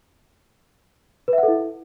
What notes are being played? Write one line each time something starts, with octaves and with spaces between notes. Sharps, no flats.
B4
E5
F#5
A4
E4